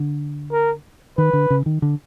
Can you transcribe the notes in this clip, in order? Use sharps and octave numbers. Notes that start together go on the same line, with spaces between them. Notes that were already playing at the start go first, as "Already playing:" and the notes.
Already playing: D3
A#4
D#3 B4
D3
C#3
D#3
D3